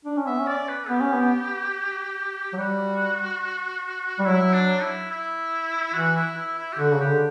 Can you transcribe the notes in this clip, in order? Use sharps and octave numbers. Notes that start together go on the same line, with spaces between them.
D4
C#4
B3 E5
C#4
D5
B4
B3 G4
C#4
B3
F#3
G3 F#4
G3
F#3 E4
D4
E4
E4
E3 F#4
E4
E4
E4
G4
D3 F#4
C#3
G4
D3